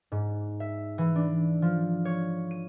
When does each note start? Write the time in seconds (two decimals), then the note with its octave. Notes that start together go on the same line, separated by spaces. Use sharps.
0.12 G#2
0.60 E5
0.98 E3
1.16 D4
1.62 F3
2.05 C#5
2.51 D#7